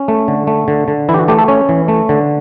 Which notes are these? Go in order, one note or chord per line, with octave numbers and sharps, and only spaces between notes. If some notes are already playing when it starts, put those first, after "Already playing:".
Already playing: C#4
A3
D3
A3
D3
D3
E3 E4
G4
F#4
A3 G4
A4
C#4 C#5
E3
A3
D3